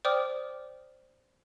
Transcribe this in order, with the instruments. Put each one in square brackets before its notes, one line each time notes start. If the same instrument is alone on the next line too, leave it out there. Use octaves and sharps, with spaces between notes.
[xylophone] C5 D5 G5 D6 D#6 F6